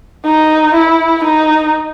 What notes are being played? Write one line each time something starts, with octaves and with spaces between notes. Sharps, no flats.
D#4
E4
D#4